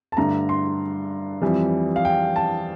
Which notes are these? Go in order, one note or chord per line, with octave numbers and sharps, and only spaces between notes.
A5
G2 D3 A3 A#5
C6
F2 E3 G3
F5
G5
A5